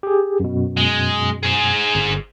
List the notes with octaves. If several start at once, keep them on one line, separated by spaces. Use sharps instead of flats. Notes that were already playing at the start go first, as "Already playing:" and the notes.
G4 G#4
F#2 B2
G#3
G#4 C5
G1